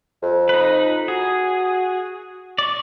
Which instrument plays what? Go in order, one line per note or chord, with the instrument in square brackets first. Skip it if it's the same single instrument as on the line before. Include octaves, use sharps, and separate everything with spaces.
[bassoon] F2
[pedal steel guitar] D#4 B4
[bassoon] F#4 [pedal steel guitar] G#4
[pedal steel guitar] D5 C#6